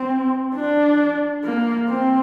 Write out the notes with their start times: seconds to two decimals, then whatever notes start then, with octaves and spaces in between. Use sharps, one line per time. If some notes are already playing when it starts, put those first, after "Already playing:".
Already playing: C4
0.55 D4
1.44 A#3
1.89 C4